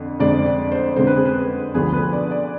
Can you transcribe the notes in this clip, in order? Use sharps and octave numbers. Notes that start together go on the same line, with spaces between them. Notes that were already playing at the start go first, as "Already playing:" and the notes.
Already playing: F2 D3
F2 D3 G#3 C4 D5
D5
C5
F2 D3 G#3 C4 C5
B4
G#4
B4
D2 D3 F3 B3 G#4
B4
D5
D5